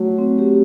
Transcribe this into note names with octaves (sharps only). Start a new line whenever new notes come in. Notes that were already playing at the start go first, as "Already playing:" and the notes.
Already playing: F#3 A3
C4
G4